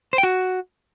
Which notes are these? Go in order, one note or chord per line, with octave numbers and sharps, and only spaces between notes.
C5
G5
F#4